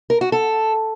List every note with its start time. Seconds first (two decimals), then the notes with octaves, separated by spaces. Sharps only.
0.10 A#4
0.21 F#4
0.32 A4